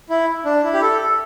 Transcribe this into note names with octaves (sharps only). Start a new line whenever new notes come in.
E4
D4
E4
G4
A4